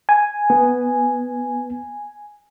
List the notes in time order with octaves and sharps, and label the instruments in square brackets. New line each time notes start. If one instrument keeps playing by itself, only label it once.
[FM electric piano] G#5
[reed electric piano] B3